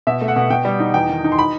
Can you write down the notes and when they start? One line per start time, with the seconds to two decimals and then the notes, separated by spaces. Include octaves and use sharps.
0.07 B2 E5
0.22 A3
0.28 F#5
0.36 B2
0.50 B2 G5
0.65 G3
0.80 D#4
0.94 E2 G5
1.09 D#3
1.24 D#4
1.32 C6
1.39 B5